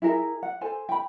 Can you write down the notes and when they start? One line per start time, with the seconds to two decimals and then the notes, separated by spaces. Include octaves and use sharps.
0.02 E4 G#4 A#4 E5
0.43 F#5
0.61 A4 C5 G#5
0.89 G5 B5